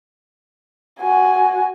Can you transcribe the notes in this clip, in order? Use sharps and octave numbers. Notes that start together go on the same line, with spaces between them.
F#4 G#5